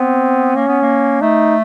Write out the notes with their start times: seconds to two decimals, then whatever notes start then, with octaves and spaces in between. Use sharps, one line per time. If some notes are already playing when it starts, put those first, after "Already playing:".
Already playing: B3 C4
0.56 A#3 C#4
0.68 B3
0.82 A#3
1.21 A3 D#4